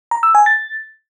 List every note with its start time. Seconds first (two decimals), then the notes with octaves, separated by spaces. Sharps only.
0.11 A#5
0.23 E6
0.35 G#5
0.46 A6